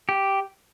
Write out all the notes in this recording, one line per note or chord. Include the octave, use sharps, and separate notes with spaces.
G4